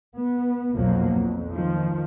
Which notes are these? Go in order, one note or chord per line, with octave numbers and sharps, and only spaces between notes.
B3
B1 F2 F3 F#3 A#3
F2
D#3 F3